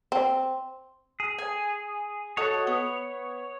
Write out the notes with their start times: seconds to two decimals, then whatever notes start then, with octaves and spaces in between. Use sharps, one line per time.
0.12 C4
1.20 G#4
1.38 G#5
2.37 F#4 A4 C#5 D#5
2.67 B3